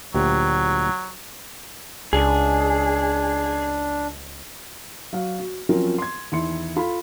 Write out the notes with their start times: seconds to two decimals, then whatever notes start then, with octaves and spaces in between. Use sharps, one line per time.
0.14 D2 A#2 F#3 G4
2.13 C#2 D4 G#4
5.13 F#3 F#4 F5
5.39 F#4
5.69 F3 F#3 C4 C#4 F4 A#4
5.98 C6 G#6
6.32 E2 D#3 E4 C6 C#7
6.76 F4 A4 F5 B5 C6